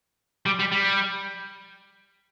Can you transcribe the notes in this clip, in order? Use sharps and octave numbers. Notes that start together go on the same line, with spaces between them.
G3
G3
G3